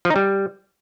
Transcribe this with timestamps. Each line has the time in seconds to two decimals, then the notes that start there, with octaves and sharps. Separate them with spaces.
0.05 F3
0.10 D#4
0.16 G3